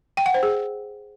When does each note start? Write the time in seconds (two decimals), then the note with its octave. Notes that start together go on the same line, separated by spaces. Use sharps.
0.17 G5
0.26 F#5
0.34 C5
0.43 G#4